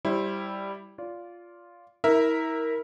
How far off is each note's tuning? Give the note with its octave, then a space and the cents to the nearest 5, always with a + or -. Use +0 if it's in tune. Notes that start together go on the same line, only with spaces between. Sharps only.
G3 +0 E4 +0 C5 +25
F4 +0 D5 -25
E4 -35 A#4 +0 E5 -5